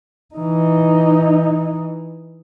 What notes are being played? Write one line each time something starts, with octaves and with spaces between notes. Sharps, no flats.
E3 D#4